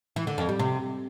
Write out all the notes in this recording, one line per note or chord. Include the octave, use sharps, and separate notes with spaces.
E3
D3
F2
G3
C3